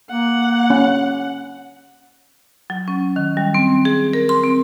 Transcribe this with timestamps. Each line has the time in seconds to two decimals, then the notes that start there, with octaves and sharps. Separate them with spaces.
0.10 A#3 F#5
0.70 C#4
2.70 F#3
2.88 C#4
3.16 D#3
3.37 G3
3.54 C4
3.85 G#4
4.13 A#4
4.29 C6
4.44 C4